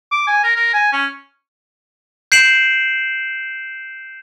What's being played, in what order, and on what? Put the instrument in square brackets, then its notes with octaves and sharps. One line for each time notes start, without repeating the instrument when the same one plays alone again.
[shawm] D6
G#5
A#4
A#4
G#5
C#4
[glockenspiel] G6 C7 D7 E7 F#7